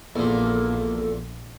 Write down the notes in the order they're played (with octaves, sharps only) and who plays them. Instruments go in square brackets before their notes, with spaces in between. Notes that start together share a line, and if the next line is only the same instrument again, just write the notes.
[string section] A#1 [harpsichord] E2 A#2 [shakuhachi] A#3 [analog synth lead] A4